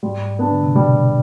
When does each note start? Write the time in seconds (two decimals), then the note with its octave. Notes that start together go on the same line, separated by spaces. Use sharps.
0.03 G#2 G3
0.39 B3 D4
0.50 D3
0.63 C3
0.75 B2 G3